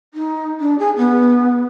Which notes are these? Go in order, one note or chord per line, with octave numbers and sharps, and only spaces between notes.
D#4
D4
G#4
B3